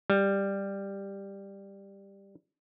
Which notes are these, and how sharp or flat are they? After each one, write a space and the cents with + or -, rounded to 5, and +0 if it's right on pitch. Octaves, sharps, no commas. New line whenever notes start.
G3 +10